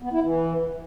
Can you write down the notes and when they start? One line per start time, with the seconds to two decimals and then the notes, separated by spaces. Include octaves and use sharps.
0.02 B3
0.13 E4
0.23 E3